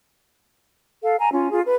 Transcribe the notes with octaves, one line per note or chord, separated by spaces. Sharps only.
A4 F5
G#5 A#5
C#4 F4
F4 G#4
B4